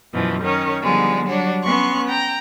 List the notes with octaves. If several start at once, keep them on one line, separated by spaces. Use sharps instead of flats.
F#2 B2 E3 F3
D#3 C#4 C#5
D3 F3 G3 G#3 B3 D#4
F#3 G3 D4 F#4 C#5
B3 C#4 C6 C#6 F#6
G5 A#5